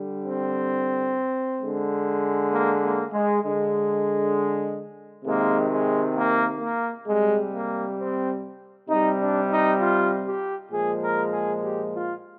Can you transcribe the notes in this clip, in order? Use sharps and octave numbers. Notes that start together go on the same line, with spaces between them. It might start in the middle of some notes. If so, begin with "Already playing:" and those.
Already playing: D3 G3
C4
D3 G#3
A#3
A#3
G#3
D3 G#3
C3 D#3 G#3 A#3
G#3
A#3
A#3
C3 G3 G#3
A#3
C4
C3 G3 D#4
D4
D#4
F4
G4
A#2 F3 G#3 G#4
A#4
G#4
G4
F4